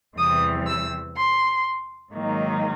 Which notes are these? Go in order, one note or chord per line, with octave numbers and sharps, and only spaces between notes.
E2 C3 E3 G3 C4 D#6
E6
C6
G#2 D#3 F#3 A#3 D#4